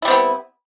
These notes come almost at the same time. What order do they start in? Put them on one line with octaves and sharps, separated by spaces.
E4 G3 C4 B3